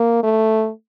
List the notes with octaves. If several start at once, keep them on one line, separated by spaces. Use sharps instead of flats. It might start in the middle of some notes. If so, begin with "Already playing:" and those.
Already playing: A#3
A3